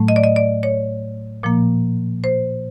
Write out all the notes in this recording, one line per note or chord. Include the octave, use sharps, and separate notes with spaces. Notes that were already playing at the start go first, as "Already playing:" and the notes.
Already playing: A2 F#3 A3
D#5
D5
D#5
D5
C#5
A#2 F3 A#3
C5